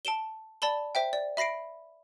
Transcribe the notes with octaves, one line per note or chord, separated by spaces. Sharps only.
A5 D7 E7 G7
D5 A5 B5 G7
C5 E5 G5
D5
E5 B5 A#6 C7 D7